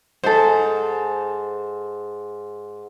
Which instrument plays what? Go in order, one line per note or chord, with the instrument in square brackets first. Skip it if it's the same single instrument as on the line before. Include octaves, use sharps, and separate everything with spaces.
[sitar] G#2 [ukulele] A4 C5